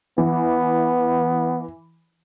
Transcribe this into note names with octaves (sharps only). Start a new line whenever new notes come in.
E3 B3